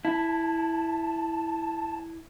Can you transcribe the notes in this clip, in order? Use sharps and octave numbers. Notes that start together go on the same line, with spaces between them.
E4 A5